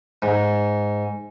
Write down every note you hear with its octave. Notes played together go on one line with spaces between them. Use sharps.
G#2